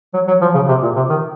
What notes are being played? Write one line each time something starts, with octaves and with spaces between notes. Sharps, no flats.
F#3
F#3
F3
C#3
C3
A#2
C3
D#3